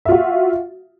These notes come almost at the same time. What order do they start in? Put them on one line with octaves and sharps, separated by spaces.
E5 F4 F#4